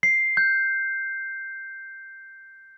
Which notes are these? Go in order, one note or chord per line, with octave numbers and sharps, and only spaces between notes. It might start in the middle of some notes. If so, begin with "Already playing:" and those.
C7
G6